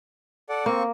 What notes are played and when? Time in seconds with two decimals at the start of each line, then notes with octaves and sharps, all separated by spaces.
0.49 A4 D5 F#5
0.66 A#3 C4 C#6